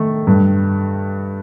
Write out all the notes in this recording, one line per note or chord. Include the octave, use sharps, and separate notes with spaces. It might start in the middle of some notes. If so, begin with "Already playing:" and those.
Already playing: D#3 A3
G2